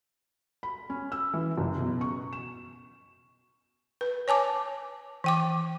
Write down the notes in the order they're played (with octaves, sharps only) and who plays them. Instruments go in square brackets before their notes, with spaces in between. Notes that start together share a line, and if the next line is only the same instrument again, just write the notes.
[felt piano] B5
C#4
E6
E3
F#1
B2
C#6
E7
[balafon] B4
C#5 G#5 A5 D6
E3 G5 D6